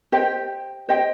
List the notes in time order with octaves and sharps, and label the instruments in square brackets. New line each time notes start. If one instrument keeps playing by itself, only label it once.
[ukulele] G4 C5 D#5 G5
G4 C5 D#5 G5